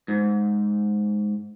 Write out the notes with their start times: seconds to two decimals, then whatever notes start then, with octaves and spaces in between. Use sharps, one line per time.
0.08 G#2